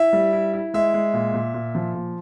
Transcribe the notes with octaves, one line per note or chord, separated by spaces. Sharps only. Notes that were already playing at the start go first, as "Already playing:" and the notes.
Already playing: E4 E5
G3
E4
E4
G#3 E5
G#3
A#2
A#2
A#2
F3
A#2